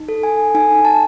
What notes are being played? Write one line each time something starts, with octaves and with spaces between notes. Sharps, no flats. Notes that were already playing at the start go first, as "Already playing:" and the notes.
Already playing: D#4
A4
G#5
D#4 G#5
A5